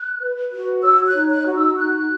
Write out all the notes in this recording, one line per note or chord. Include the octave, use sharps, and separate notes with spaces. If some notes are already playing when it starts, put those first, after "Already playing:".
Already playing: F#6
B4
F#4
C#5 E6
F#6
D#4
F#6
F#4
E6
D#4 F#6